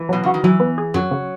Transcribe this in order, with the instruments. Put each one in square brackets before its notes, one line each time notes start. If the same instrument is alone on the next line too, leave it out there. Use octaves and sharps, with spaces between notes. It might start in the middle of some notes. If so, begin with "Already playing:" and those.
Already playing: [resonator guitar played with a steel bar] E3
[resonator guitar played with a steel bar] B2 [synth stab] F#3
[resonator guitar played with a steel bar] C#3 [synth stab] F#4
[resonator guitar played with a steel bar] D#3
[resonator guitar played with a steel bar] E3 [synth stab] F#3
[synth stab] B3
G#4
[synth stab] F#2 [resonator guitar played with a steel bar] F#3
[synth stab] C#3